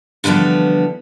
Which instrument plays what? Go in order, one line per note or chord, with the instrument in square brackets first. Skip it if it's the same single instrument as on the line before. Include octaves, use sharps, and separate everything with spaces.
[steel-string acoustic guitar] D3 E3 F3 G3 B3